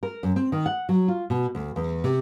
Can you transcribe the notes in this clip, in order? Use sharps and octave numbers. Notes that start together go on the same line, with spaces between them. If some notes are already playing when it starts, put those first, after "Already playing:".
A#4
F#2
C4
D#3
F#5
F#3
F4
B2
D2
E2
C3